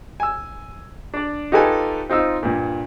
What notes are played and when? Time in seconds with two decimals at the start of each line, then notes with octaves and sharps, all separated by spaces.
0.20 G#5 E6
1.14 D4 D5
1.52 D#4 F4 G4 A4 B4 G#5
2.09 C4 D#4 F4 E6
2.43 G2 A#2